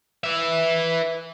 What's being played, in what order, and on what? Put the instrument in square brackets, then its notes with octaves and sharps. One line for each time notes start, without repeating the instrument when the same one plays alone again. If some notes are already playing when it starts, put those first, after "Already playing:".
[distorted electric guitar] B4 E5